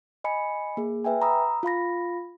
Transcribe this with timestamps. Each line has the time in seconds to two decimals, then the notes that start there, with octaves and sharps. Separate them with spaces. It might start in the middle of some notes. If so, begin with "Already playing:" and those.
0.24 D#5 G#5 B5 C#7
0.77 A#3 G#4
1.04 B4 E5 G5 G#5
1.22 A#5 B5 D#6 E6
1.63 F4 F5 B5 A#6